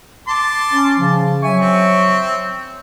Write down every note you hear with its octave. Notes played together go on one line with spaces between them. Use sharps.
A5 C6 D6
C#4
C#3 F3
F#3 E5 G#5 C#6
C4